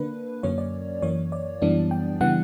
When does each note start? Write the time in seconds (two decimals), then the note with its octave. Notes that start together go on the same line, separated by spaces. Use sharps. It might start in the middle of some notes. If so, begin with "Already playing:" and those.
Already playing: D3 A#3 D4 B4
0.43 F#2 D3 F#3 A#3 C#4 C#5
0.58 D5
1.02 F#2 E3 A#3 C#5
1.32 D5
1.62 F#2 E3 G3 B3 D4
1.91 G5
2.21 C#3 E3 G3 B3 D4 F#5